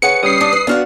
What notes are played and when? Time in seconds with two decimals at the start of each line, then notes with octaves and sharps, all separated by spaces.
0.02 G#4 B4 C#5 F#5 C#7
0.23 G3 C#4 D#6 C7
0.41 D4
0.53 B4
0.67 B3 D4 F#4 F5 F#5 F6